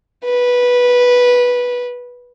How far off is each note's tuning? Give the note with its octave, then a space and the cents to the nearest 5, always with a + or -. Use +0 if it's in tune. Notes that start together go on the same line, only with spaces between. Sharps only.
B4 -10